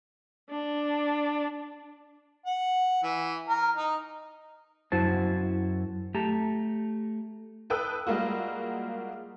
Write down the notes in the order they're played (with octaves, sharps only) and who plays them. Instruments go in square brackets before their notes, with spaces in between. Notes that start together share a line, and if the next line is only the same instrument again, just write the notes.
[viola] D4
[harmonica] F#5
E3
A#4
D#4
[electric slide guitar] F#2 E4 F#4 C5 A5
A3 G4 A5 A#5
[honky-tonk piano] A4 B4 G5 D#6 E6 F#6
G3 G#3 A#3 F4 F#4